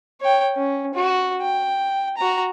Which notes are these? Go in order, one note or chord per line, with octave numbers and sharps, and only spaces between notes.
C#5 G5
C#4
F#4
G5
F#4 A#5